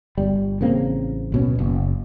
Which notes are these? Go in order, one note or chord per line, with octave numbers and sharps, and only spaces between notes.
G1 G3
A1 C#3 A#3 C4
D1 B2 C#4
F#1